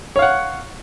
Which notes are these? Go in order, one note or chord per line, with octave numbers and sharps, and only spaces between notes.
C#5 F5 F#5